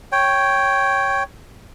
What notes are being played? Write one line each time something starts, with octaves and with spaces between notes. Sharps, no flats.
C#5 G5